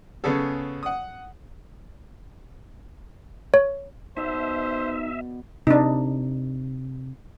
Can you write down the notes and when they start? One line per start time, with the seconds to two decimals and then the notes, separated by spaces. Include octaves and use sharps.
0.24 C#3 B3 C#4 G#4 A4
0.83 F#5 D#6
3.54 C#5
4.17 B2 B3 D#4 C5 D5 E5
5.67 C3 D4 D#4